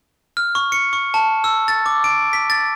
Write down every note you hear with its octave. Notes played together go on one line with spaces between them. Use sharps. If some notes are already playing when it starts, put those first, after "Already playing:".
F6
C#6
C#7
C#6
A5
E6
A6
D6
D7
B6
A6